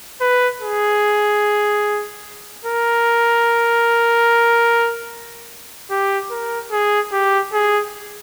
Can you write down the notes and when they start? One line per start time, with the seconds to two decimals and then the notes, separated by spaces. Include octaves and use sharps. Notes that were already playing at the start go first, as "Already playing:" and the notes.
0.21 B4
0.61 G#4
2.65 A#4
5.90 G4
6.31 A#4
6.72 G#4
7.12 G4
7.53 G#4